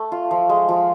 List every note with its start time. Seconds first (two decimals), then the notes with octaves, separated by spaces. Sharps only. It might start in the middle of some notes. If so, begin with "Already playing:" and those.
Already playing: A3
0.12 F4
0.31 F3
0.49 G#3
0.69 F3